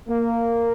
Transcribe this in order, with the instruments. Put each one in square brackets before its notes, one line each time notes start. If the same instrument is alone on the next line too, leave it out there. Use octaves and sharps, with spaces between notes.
[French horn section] A#3